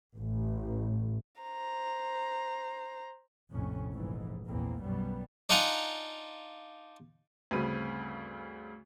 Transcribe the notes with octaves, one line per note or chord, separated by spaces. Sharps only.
A1
C5 A#5
A#1 F2 A2 C3 C#4
F1 A#1 G#2 E3 G#3
A#1 E2 A#2 A#3 C4
B1 F#2 B2 G3 B3
D4 D#4 F4 F#5 G#5 A#5
D2 G2 C#3 C4 B5 D#7